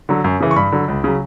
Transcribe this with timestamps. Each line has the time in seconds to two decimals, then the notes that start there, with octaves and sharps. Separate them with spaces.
0.09 D3 F#3
0.24 F#2
0.40 C#3 E3
0.51 C#6
0.56 G2 B5
0.72 D3 F#3
0.88 C#2
1.04 C#3 F#3